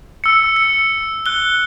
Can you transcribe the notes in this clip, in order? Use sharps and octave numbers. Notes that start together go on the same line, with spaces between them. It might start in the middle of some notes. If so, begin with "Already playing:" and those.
E6 C#7
C#7
F#6 G7